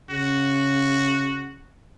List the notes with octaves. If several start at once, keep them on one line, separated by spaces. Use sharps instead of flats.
C#3 F#4